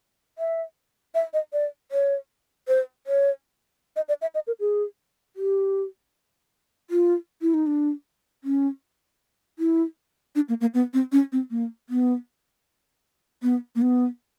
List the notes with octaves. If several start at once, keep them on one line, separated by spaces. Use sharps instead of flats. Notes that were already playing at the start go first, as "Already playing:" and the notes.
E5
E5
D#5
D5
C#5
C5
C#5
D#5
D5
E5
D#5
A#4
G#4
G4
F4
E4
D#4
D4
C#4
E4
D4
A#3
A#3
B3
C4
C#4
C4
A#3
B3
B3
A#3
B3